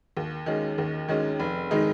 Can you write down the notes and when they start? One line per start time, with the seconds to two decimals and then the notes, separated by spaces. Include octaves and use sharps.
0.17 D#2
0.46 D#3 G#3 C#4
0.78 D#2
1.08 D#3 G#3 C#4
1.39 F1
1.71 D#3 G#3 D#4